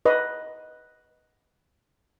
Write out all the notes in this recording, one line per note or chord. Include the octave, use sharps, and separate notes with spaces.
B4 D#5